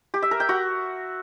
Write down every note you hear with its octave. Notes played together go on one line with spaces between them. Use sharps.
G4
E5
A#4
G5
F#4